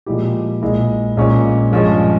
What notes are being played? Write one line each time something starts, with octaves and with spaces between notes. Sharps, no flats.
A#2 F3 G#3 E4 G4
A#1 A#2 G#3 E4
A#1 A#2 G#3 C#4
G2 F3 G#3 C#4